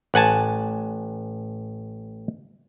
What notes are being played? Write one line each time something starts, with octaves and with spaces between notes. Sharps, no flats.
A1 F#5 G#5 A5